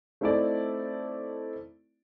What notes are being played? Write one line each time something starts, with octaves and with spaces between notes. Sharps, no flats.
A3 C4 D#4 E4 A4 D5